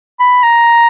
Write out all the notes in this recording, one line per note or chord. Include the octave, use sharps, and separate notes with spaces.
B5
A#5